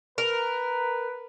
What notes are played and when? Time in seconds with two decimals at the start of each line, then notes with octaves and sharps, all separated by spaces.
0.18 A#4 B4